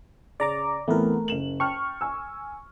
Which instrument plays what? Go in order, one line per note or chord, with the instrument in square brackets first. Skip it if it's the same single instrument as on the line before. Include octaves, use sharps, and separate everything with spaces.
[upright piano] C#3 [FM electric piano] D5 A#5 D6
[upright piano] E3 B3 C4 [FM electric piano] A3 A#4
[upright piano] F#1 E7 F#7
[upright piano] G5 A5 F6 [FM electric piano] C#6
[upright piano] G#5 E6